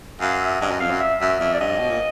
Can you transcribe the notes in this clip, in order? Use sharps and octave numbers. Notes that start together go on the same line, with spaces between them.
F#2 F5
E5
G2 D#5
F#2
F2 F5
F#2
E5
F#2 E5
F2 E5
D5
G2 D#5
B2
A#2